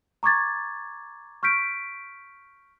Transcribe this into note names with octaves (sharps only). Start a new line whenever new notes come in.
A#5 C#6 D6 G#6 A6
C#6 F6 G6 B6 D7